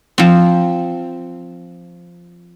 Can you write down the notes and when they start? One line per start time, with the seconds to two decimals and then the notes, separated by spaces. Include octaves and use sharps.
0.18 F3 C4